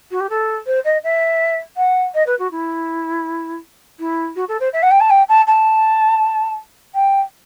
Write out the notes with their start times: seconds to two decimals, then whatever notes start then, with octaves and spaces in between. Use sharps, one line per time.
0.11 F#4
0.20 G4
0.29 A4
0.66 C5
0.84 D#5
1.03 E5
1.77 F#5
2.14 D#5
2.26 B4
2.39 F#4
2.51 E4
3.99 E4
4.36 F#4
4.48 A4
4.60 C5
4.73 E5
4.82 F#5
4.91 G5
5.00 A5
5.10 G5
5.28 A5
5.47 A5
6.94 G5